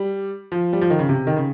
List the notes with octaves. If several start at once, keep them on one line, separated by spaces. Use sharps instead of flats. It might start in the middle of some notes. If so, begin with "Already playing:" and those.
Already playing: G3
F3
G3
F3
D#3
C#3
C3
D#3
C#3